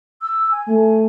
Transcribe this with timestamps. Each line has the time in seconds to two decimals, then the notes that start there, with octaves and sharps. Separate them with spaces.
0.22 E6
0.51 G#5
0.67 A3 G#5